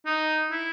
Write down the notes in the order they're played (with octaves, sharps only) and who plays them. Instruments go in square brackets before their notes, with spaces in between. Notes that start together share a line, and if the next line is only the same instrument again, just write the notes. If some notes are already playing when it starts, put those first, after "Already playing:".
[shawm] D#4
E4